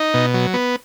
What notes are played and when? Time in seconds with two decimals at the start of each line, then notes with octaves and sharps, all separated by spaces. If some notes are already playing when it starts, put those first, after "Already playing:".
Already playing: D#4
0.14 B2
0.34 F#3
0.54 B3